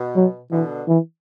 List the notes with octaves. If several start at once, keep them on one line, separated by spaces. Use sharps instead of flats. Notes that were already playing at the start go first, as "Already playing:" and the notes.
Already playing: B2
F#3
B2 D3 E3
E3